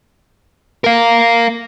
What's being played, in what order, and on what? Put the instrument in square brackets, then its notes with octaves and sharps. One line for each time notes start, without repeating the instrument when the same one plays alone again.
[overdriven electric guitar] A#4 F5